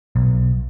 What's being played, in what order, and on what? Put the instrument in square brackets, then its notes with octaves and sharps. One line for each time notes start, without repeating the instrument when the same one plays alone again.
[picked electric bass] B1